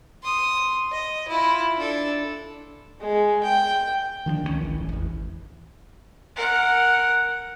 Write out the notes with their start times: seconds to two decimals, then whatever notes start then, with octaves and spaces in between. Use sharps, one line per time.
0.23 C6 D#6
0.92 D#5
1.28 E4 F4
1.77 D4 A4
3.00 G#3
3.43 G5
4.26 D#3 F3 B3 D4
4.43 C#2 D#3 E3 C#4
4.61 G#1 E3
4.78 D1
4.92 G#1 E2
6.36 A#4 F#5